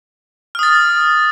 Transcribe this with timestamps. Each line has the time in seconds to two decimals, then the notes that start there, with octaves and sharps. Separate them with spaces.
0.55 F6
0.59 D#6
0.63 A6